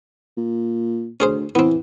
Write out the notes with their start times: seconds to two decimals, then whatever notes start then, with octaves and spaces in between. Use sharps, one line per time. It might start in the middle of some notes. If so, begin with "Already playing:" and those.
0.37 A#2
1.20 D2 C#4 G#4 C5
1.55 E3 B3 C4